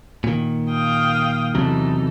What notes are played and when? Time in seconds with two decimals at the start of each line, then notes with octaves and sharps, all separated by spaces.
0.24 A#2 D#3
0.70 F5 G5 D#6
1.55 E2 C3 E3 F#3 D#4 A4